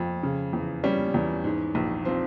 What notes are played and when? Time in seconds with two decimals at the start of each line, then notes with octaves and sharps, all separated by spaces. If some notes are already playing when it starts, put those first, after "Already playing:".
Already playing: F2
0.23 C#3
0.53 E2
0.84 G3 C#4
1.14 E2
1.44 G#2
1.75 A#1
2.05 F3 C4